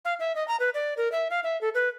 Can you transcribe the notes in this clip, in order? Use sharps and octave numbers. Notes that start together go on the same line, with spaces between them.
F5
E5
D#5
A#5
B4
D5
A#4
E5
F5
E5
A4
B4